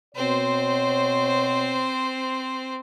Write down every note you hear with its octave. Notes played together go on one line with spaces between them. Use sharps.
B2 C4 C5 C#5